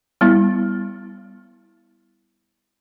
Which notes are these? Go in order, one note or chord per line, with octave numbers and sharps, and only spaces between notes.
G3 B3 E4